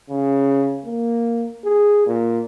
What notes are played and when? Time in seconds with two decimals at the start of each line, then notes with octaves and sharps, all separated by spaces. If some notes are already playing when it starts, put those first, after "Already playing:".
0.10 C#3
0.86 A#3
1.65 G#4
2.07 A#2